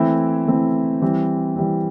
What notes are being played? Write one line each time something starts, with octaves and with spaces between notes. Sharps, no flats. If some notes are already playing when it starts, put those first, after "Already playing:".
Already playing: E3 A3 C4 E4
E3 A3 C4 E4
E3 G3 C4
E3 G3 C4